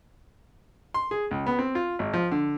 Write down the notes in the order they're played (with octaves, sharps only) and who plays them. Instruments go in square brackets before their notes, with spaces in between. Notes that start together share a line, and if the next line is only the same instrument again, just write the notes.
[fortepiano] C6
G#4
C#2
B3
C4
F4
G#1
F3
D3